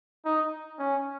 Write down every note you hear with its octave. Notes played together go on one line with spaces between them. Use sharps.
D#4
C#4